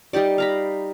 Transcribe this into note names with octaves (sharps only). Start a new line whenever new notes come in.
G3 D#4 G4 D5
F5 A#5 B5